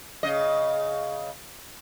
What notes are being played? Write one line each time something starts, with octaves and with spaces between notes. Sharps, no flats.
C#3 D#5